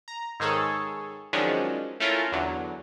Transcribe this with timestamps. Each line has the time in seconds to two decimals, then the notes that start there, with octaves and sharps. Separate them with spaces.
0.08 A#5
0.40 G#2 D#3 G#4 A4 C#5
1.33 D#3 F3 F#3 G#3 C#4 D4
2.00 A3 C#4 E4 F4 A4 A#4
2.32 E2 D3 F#3